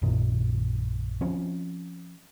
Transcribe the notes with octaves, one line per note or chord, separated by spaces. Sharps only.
A#1 F#2 A#2 D#3
F3 C4 C#4